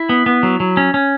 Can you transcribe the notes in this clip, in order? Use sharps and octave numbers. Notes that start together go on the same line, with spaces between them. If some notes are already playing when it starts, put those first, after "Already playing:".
Already playing: E4
B3
B3
F#3
F#3
C#4
C#4